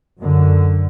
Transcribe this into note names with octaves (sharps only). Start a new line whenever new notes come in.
F#2 D3